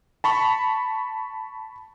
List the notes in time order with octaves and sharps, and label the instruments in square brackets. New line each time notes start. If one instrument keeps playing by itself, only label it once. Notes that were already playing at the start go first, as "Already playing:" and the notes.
[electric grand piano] A5 B5 C#6